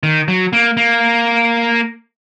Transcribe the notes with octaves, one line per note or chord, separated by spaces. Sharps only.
D#3
F#3
A#3
A#3